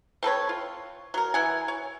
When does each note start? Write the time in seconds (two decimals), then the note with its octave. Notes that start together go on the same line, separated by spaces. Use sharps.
0.23 C4 A4 B4 C#5
0.49 F4
1.14 F#3 A#4
1.34 E3 F#5 G#5
1.68 C#5